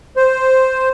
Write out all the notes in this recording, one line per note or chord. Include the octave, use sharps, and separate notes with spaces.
C5